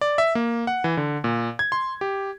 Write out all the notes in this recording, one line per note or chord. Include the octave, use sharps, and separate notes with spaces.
D5
E5
A#3
F#5
E3
D3
A#2
G#6
C6
G4